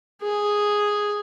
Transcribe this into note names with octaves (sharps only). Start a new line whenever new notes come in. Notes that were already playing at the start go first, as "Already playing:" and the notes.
G#4